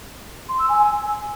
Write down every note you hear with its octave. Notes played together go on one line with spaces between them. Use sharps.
C6
E6
G#5